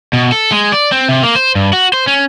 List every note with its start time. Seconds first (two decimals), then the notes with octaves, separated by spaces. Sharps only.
0.13 B2
0.32 A4
0.52 G#3
0.72 D5
0.92 C4
1.09 C3
1.23 A#3
1.36 C5
1.55 G2
1.73 F#4
1.93 C5
2.07 C#4